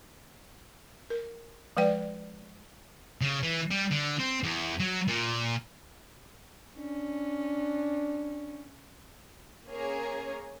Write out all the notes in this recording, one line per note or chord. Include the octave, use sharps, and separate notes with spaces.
A#4
F3 G#3 B4 D5 G5
C#3
E3
G3
D3
C4
E2
F#3
A#2
C#4 D4
A#3 C#4 G#4 A#4 C#5